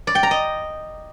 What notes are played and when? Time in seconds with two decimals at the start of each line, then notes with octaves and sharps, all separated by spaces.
0.07 D5
0.15 G5
0.23 A#5
0.31 D#5